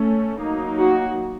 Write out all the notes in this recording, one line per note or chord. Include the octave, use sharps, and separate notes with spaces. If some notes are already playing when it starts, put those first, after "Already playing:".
Already playing: A3 C#4
F#3 A#3 D#4
F#4